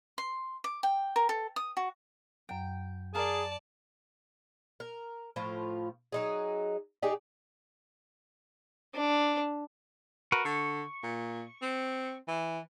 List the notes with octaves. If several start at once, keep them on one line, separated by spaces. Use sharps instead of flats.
C6
D6
G5
A#4
A4
D#6
F#4
F#2 F#3 G5
G#4 A#4 D5 F5 A5
A#4
A2 F3 F4
F#3 D#4 G#4
D#4 G4 G#4 D5
D4
F#4 A#4 B4
D3 C#6
A#2
C4
E3